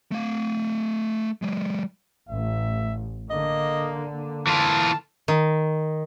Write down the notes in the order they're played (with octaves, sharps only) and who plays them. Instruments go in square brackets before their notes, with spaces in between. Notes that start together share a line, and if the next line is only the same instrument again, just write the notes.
[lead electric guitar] A3 F5
F#3 G#3
[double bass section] A1 [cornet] E5
[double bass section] D3 [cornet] A#3 [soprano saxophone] D#5
[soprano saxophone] A#3
[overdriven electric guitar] E3 F4 [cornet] A5
[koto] D#3